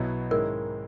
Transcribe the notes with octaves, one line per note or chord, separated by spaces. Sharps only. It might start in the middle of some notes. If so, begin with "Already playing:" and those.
Already playing: B1 B2 F#3 B3 E4
G#2 D#3 G#3 C#4 E4 A#4